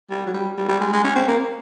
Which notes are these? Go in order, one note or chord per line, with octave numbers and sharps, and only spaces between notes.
G3
F#3
G3
G3
G3
G#3
G#3
C#4
C4
A#3